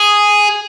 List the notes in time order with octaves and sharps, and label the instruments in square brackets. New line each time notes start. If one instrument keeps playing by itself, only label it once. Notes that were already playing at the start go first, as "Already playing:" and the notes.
Already playing: [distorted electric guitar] G#4